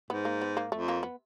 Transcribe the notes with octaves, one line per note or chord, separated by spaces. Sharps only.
G#2 B3
A#3
B3
A#3
F2 A3
A#3
B3